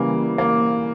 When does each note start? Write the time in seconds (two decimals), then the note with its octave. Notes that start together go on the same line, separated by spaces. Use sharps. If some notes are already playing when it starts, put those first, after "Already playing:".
Already playing: C#3 E3 G3 A#3
0.38 A#3